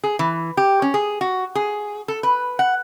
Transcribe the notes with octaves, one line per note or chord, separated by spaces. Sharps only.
G#4
E3
G4
C#4
G#4
F#4
G#4
A4
B4
F#5